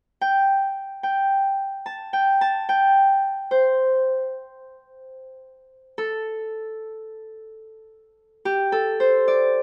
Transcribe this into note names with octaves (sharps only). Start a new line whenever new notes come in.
G5
G5
A5
G5
A5
G5
C5
A4
G4
A4
C5
D5